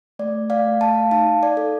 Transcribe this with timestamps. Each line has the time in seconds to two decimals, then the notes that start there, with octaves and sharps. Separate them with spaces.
0.19 A3 D5
0.50 D5 F5
0.65 A3
0.81 F5 A5
1.11 D#4 F5 A5
1.43 D5
1.57 A4